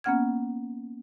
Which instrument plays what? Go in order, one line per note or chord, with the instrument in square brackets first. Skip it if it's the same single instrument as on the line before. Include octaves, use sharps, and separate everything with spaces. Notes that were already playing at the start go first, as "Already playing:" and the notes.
[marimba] A#3 B3 C#4 F#5 F6 G#6